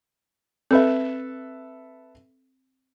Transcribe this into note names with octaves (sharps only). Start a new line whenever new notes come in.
C4 A4 B4 E5